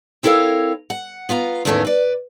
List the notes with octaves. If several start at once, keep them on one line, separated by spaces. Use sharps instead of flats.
C4 E4 A4 A#4 C#5 F5
F#5
B3 F4 F5 A#5
E2 A2 D#3 A3 A#3 C#4
B4 D5